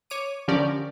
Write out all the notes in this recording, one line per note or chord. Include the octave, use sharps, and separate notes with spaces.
C#5 D6 D#7
D3 F3 C#4 G4 A#4 D5